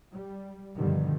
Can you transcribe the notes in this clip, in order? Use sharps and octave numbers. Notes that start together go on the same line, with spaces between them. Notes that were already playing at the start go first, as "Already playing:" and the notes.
G3
G2 B2 D3 D#3 F3 G3